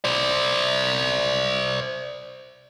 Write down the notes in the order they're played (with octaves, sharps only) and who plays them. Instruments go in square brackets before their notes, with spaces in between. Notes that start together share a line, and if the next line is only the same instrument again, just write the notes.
[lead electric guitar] C5 D5